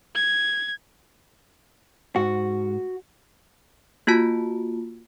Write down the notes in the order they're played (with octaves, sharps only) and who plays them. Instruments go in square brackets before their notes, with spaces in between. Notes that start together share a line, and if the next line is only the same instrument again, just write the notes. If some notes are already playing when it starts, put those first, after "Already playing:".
[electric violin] G#6
[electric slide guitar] G#2 [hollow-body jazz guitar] F#4
[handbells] A#3 F4 F#4 A5